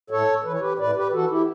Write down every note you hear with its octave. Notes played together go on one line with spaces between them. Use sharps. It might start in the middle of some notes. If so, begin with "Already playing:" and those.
A2 A4 C#5
E3 B4
C#5
G4 B4
A2 B4 D5
G4 B4
E3 F#4 A4
E4 G4